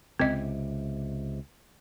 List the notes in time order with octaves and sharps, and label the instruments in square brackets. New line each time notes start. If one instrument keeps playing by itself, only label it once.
[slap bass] C#2 C3 [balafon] C4 D#5